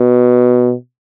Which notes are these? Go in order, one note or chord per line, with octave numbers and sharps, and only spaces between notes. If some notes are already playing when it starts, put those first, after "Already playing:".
Already playing: B2